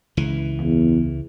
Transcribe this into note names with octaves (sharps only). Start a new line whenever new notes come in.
C#2 E3
E2